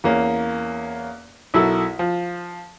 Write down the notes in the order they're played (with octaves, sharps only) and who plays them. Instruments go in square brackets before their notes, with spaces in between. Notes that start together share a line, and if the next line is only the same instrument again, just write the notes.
[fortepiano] E2 A#3 C#4
B1 E4 F#4 A4 A#4 E6
F3